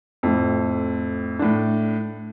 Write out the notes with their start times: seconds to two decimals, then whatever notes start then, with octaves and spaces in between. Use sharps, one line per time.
0.23 F2 A2
1.39 A2 D4